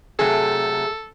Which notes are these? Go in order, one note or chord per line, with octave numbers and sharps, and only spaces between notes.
C3 F#3 A3 G#4 A4